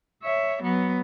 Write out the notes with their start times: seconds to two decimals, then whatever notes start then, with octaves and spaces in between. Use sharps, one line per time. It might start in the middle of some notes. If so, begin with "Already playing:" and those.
0.23 C#5 E5
0.63 F#3 B3